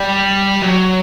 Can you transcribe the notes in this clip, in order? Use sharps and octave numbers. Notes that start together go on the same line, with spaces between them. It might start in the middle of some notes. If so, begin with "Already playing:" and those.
Already playing: G3
F#3